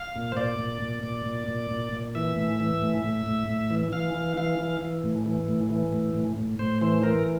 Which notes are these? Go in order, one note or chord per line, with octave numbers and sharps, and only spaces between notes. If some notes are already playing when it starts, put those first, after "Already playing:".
Already playing: F5
A#2
C5
A#2 D5
A#2
A#2
A#2
A#2
A#2
A#2
A#2
E3 E5
A2
E3
A2
A2
A2
A2
E3
E3 F5
E3
E3 F5
E3
E3
A2
E3
A2
E3
A2
A2
A2
A2 C5
E3 C5
E3 A#4